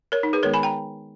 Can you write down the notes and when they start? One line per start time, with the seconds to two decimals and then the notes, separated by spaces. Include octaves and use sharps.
0.12 A#4 C#5
0.23 D#4
0.33 G#4 B4
0.43 D#3 G#3 B3 A#4 C#5
0.54 G#5 B5
0.63 G5 A#5